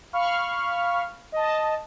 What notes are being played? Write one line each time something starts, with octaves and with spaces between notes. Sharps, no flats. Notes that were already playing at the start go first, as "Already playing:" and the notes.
F5 B5 C#6 F6
D#5 A5